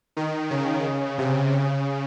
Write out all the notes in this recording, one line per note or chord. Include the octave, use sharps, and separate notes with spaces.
D#3
C#3
C3
C#3